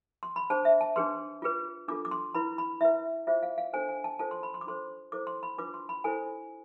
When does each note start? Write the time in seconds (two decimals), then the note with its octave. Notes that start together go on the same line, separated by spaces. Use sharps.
0.23 C6
0.36 B5
0.50 D4 G#4 C5 A5
0.65 E5
0.81 A5
0.96 D4 G#4 B4 C6
1.42 F4 G#4 B4
1.88 D4 F4 A4 D6
2.05 D6
2.11 C6
2.35 E4 B4 B5
2.58 B5
2.81 E4 B4 E5
3.27 F4 G#4 C5 E5
3.43 F5
3.58 F5
3.73 D4 A4 C5 G#5
3.89 G#5
4.04 A5
4.19 F4 A4 C5 A5
4.31 C6
4.43 B5
4.54 C6
4.61 D6
4.66 D4 F4 A4 C5 C6
5.12 E4 A4 C5 D6
5.27 C6
5.43 B5
5.58 D4 F4 B4 D6
5.74 C6
5.89 B5
6.04 E4 A4 C5 G#5